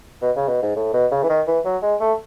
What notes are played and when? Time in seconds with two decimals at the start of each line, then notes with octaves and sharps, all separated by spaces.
0.22 B2
0.36 C#3
0.48 B2
0.62 G#2
0.76 A2
0.94 B2
1.11 C#3
1.23 E3
1.29 D#3
1.47 E3
1.65 F#3
1.82 G#3
2.00 A3